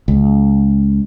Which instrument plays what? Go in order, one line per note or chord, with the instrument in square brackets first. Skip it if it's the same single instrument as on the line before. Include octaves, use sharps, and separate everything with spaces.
[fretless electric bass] C#2